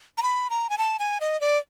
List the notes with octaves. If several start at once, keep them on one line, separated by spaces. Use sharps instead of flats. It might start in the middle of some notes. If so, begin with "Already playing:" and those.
A#5
B5
A#5
G#5
A5
G#5
D#5
D5